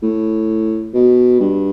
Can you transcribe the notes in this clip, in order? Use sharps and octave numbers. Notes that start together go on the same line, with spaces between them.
A2
B2
G2